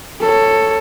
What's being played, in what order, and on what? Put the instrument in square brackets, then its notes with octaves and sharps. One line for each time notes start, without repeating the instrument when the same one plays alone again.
[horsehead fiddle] A4 C#5